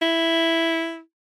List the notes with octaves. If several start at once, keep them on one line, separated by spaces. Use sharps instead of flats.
E4